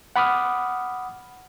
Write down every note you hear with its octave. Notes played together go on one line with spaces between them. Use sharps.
F#5 B5 D6 D#6 F6